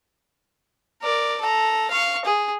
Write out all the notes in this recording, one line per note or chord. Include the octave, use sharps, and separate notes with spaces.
A#4 D5
A4 A#5
F5 C#6
G#4